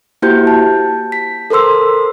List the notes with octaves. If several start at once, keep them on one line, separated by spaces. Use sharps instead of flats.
A#3 E4 F#4 G4 C5 G6
A5
B6
A4 A#4 C5 C6 E6